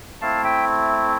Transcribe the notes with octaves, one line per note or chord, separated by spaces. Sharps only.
A3 C4 E4 F5 A5
E5 G5